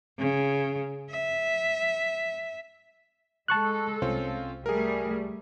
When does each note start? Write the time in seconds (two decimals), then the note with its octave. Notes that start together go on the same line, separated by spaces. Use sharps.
0.19 C#3
1.10 E5
3.48 G#3 A4 A5 C#6 F#6
4.02 C2 C4 C#4 F4
4.66 G3 A3 G#4 A#4